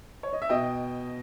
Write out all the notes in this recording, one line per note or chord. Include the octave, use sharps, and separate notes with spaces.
C#5
D#5
E5
B2 D#5 G5